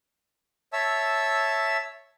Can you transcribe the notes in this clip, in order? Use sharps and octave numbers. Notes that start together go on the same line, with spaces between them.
C#5 E5 A5 E6